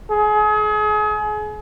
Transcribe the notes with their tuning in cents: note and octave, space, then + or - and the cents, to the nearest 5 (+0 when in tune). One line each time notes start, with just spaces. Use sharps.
G#4 +35